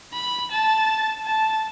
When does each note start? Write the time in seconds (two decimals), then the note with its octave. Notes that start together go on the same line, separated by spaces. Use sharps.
0.13 B5
0.52 A5
1.26 A5